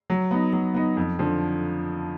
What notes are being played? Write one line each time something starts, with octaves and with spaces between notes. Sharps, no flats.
F#3
B3 D#4
F#3
B3 D#4
F2
D3 F3